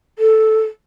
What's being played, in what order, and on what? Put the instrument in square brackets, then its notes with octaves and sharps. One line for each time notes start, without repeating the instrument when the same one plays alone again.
[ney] A4